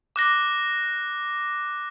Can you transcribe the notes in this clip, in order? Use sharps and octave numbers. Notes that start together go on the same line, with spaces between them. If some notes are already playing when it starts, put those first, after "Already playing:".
D6 F#6 A#6